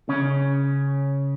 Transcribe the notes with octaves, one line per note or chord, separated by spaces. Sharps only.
C#3 C#4